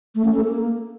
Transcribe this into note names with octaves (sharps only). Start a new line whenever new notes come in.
A3
C#4
A4
A#3